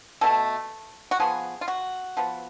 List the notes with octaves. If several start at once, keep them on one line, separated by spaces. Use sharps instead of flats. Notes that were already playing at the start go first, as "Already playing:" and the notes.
B2 A3 A4
F#4
F3 B3 G#4
F4
F#4
F3 B3